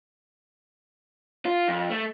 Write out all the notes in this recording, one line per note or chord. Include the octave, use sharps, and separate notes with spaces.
F4
F2
A3